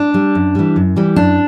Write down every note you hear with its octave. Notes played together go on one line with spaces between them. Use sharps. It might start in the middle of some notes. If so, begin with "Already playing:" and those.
Already playing: D4
G3
F#2
E3 G3
F#2
E3 G3
F#2 D4